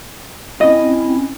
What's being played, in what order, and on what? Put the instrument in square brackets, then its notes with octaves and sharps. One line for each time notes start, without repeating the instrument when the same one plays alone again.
[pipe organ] C4 C#4 E4 [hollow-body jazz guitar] D#5